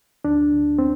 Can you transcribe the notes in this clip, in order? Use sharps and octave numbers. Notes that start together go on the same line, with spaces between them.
D2 D4
D2
C4